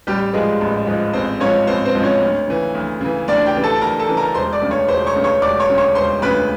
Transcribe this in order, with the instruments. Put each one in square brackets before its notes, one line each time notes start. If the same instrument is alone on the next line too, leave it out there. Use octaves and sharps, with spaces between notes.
[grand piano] A1 G3 G4
G#2 F3 G#3 G#4
A1
G#2 F3
A1 C4 C5
G#2 F3 C#4 C#5
A1 C4 C5
C4 C5
G#2 F3
C#4 C#5
D2
C#3 E3
D2
C#3 E3
D2 D4 D5
G4 G5
C#3 E3
A4 A5
A5
D2 A#4 A#5
A4 A5
C#3 E3
A#4 A#5
E1 C5 C6
D5 D6
D2 C#3
C#5 C#6
E1 C5 C6
C#5 C#6
D2 C#3
C#5 C#6
E1 D5 D6
C#5 C#6
D2 C#3
C#5 C#6
E1 C5 C6
D2 C#3 B4 B5